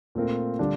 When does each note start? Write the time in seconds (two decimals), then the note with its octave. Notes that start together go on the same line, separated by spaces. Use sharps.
0.15 A#2 A3 C4 F4 A#4
0.59 D3 G3 D4 F4